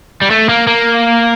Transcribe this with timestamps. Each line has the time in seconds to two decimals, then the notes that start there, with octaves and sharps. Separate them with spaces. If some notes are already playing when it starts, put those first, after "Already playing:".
0.21 G3
0.30 A3
0.49 A#3
0.67 A#3